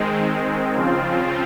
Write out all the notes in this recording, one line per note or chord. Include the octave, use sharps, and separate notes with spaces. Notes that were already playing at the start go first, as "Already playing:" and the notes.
Already playing: D#3 G#3 C4
C#3 F3 C4 F4